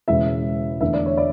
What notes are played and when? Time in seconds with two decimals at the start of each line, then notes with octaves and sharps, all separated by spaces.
0.08 E1 E2 C#3 E3 G#3 E5
0.81 E2 D3 A3 D4 E5
0.94 D5
1.06 C#5
1.17 D5